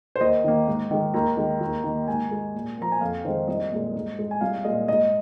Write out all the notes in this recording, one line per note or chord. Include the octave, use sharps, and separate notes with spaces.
C5
D#2 D#5
D#3 A#3
G#2
D#3 G#3
D#2 A#5
D#3 G#3
D#2
D#3 A#3
G#2 G#5
G#3
A#2
F3 A#3 A#5
G#5
F2 F5
D#3 G#3 C5
C2 D#5
A#2 G#3
G#2
G#3
G#5
C2 F5
A#2 G#3 D#5
G#2 D#5